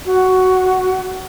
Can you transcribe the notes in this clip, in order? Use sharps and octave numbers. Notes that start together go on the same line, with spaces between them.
F#4